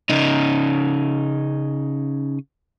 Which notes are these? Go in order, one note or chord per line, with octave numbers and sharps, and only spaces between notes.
C#3 D#4